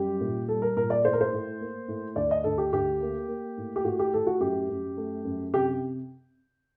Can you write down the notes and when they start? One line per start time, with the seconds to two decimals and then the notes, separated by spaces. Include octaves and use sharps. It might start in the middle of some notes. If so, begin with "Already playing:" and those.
Already playing: F#2 G3 G4
0.21 A#2
0.48 G3 A4
0.62 A#4
0.76 A#2 A#4
0.90 D5
1.04 A2 C5
1.13 A#4
1.21 C5
1.32 A2
1.61 A#3
1.88 A2
2.16 D2 D5
2.31 D#5
2.44 D2 A4
2.58 G4
2.73 D2 G4
3.01 A#3
3.28 A#3
3.57 A2
3.76 G4
3.84 A2 F#4
3.99 G4
4.13 A2 A4
4.27 F#4
4.40 F#2 G4
4.69 F#2
4.97 A3
5.24 F#2
5.54 C3 G4